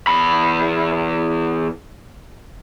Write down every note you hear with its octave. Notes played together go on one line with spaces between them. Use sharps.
E2 B5